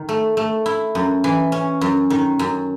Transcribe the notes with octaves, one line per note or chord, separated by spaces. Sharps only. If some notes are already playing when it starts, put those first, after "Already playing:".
Already playing: D#3
A3
A3
E4
F#2
E3
C#4
F#2
D#3
F#2